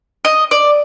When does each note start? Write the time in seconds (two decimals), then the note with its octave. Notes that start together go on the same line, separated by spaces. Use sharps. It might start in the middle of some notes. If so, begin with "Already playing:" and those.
0.25 D#5
0.51 D5